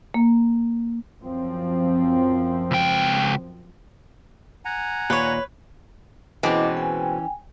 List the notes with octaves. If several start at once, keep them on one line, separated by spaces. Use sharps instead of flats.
A#3
F#2 F3 C4
C#2 G5
F#5 G#5 A#5
D#2 A#2 B4 C#5
B2 E3 G#3 C4 C#4 E4 D#5 D6
G5 G#5